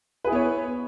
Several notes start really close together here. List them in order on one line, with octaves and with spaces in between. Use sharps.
B4 G#4 E4 B3 C#5